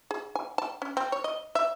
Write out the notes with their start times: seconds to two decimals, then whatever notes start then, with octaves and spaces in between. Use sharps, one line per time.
0.11 G#4
0.35 G#5
0.58 A5
0.82 C#4
0.97 C4
1.12 C#5
1.24 D#5
1.55 E5